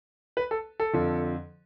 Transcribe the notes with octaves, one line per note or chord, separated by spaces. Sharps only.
B4
A4
A4
F2 D3 F3